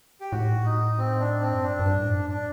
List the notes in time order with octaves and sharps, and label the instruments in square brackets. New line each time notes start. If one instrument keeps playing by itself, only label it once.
[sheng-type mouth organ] G4
[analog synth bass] A2 [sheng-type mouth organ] F#4
[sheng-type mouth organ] D#4
C4
D4
C4
[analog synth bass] F#2
[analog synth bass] G2 [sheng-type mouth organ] D4
[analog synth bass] G2
A2
F#2
[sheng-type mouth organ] D4